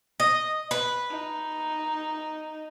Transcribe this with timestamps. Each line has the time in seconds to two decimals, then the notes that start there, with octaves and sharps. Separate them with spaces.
0.20 D#5
0.71 B4
1.10 D#4